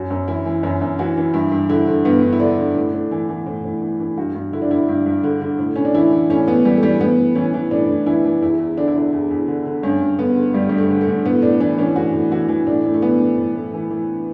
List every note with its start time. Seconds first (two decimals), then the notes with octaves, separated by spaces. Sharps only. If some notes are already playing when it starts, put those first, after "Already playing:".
Already playing: F#2 F#4
0.10 F#2
0.28 E3 E4
0.46 E3
0.63 F#2 E4
0.81 F#2
0.99 E3 F#4
1.17 E3
1.34 G2 E4
1.52 G2
1.69 D3 E4
1.87 D3
2.05 G2 B3
2.23 G2
2.33 E4
2.40 D3 D4
2.58 D3
2.76 A2
2.94 A2
3.11 E3
3.29 E3
3.46 A2
3.64 A2
3.82 E3
4.00 E3
4.17 G2 F#4
4.35 G2
4.52 D3 E4
4.62 D4
4.70 D3 E4
4.88 G2
5.06 G2
5.23 D3
5.41 D3
5.59 A2
5.76 A2 C#4
5.85 D4
5.94 E3 E4
6.12 E3
6.30 A2 C#4
6.47 A2 B3
6.65 E3 G3
6.77 A3
6.83 E3 G3
7.00 A2 B3
7.18 A2
7.35 E3 C#4
7.53 E3
7.71 A2 D4
7.89 A2
8.06 E3 E4
8.25 E3
8.42 E2 E4
8.59 E2
8.77 D3 D4
8.88 E4
8.95 D3 D4
9.13 E2
9.31 E2
9.48 D3
9.66 D3
9.83 G2 C#4
10.01 G2
10.18 D3 B3
10.36 D3
10.54 G2 G3
10.69 G2 G3
10.78 A3
10.90 D3
11.01 A3
11.07 D3
11.25 A2 B3
11.42 A2 D4
11.60 E3 D4
11.78 E3 C#4
11.96 A2 F#4
12.13 A2
12.31 E3 F#4
12.48 E3
12.67 A2 D4
12.85 A2
12.94 A3
13.02 E3 B3
13.19 E3
13.37 A2
13.55 A2
13.73 E3
13.90 E3